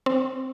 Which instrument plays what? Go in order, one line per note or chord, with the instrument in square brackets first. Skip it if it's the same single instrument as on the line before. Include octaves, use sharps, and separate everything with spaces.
[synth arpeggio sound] C4